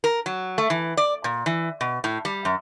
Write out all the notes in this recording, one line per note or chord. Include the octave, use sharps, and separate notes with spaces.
A#4
F#3
A3
E3
D5
A#2
E3
B2
A2
G3
F#2